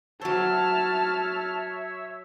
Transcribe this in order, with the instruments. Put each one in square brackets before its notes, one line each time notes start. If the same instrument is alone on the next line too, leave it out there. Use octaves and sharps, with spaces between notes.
[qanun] F#3 C5 [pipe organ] C#5 E5 E6 [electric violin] A5 F6